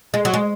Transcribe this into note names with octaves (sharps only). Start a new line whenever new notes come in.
G#3
F#3
G#3